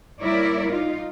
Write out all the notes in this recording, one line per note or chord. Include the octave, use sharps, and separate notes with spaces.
G3 A#3 E4 A#4 C#5 D5
D#4 F4 F5